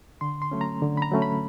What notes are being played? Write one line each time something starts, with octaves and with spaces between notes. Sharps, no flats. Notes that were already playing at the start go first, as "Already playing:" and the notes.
D3 C6
C6
F#3 A3 C#4
A#5
D3
B5
A#5
F#3 A3 C#4
B5